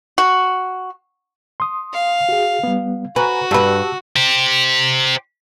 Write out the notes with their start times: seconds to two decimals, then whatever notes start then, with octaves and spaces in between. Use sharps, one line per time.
0.18 F#4
1.60 C6 D#6
1.94 F5
2.29 F#4 G#4
2.63 G3 B3
3.16 F#4 B4 G#5 A#5 C#6
3.51 G2 G4 B4 A5 E6
4.16 G4 C5